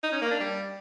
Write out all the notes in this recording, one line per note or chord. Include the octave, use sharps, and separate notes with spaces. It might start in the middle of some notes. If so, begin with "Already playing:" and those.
D#4
C#4
A#3
D4
G3